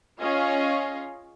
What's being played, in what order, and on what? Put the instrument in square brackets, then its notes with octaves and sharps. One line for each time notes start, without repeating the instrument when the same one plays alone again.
[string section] C#4 F4 G#4 C#5 D#5 F5